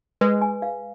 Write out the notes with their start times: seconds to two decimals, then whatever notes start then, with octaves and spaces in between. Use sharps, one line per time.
0.21 G#3 B4
0.41 G#5
0.62 F5